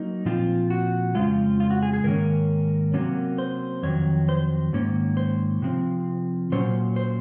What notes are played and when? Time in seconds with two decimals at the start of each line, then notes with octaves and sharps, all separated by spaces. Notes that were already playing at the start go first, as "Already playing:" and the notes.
Already playing: F#3 A#3 D#4
0.25 A#2 F3 C4 F4
0.70 F#4
1.15 F2 C#3 F3 G#3 F4
1.60 F4
1.70 F#4
1.83 G#4
1.93 G#4
2.04 G#2 D#3 A#3 C#4 A#4
2.94 C3 F#3 A#3 C#4
3.38 C5
3.83 F2 D#3 F#3 C#5
4.29 C5
4.73 G#2 D#3 A#3 C#4
5.17 C5
5.62 C3 F3 C4
6.52 A#2 F#3 A#3 C#4 C5
6.96 C5